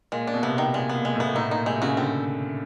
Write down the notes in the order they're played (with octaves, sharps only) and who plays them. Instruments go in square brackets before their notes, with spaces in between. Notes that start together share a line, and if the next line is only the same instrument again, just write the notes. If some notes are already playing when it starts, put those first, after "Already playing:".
[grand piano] A#2 [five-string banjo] G#3
[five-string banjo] D4
[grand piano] B2
[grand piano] C3 [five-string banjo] B3
[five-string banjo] D#3
[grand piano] A#2 [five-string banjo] G#3
[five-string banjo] B3
[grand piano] A#2
[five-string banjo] G#3
[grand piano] A2
[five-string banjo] B3
[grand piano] A2 [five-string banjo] D#4
[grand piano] A#2 [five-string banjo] D#4
[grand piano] C3 [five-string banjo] G#3
[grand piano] C#3 [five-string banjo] F#4
[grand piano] D3 [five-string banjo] C4